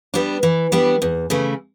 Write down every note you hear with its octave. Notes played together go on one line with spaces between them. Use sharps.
G3 B3 D4
E3
G3 B3 D4
E2
C#3 E3 A3